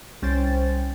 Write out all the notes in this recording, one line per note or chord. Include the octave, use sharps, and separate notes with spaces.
C2 C#4 C5 G5 A6